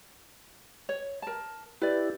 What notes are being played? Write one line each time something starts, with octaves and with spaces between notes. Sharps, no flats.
C#5
A#4 A5
E4 G4 B4 D5